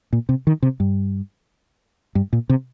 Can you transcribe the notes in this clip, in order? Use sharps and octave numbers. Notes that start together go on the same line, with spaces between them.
A#2
C3
D#3
C3
G2
G2
A#2
C3